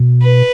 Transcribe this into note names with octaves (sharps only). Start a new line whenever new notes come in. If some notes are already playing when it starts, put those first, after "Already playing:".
Already playing: B2
B4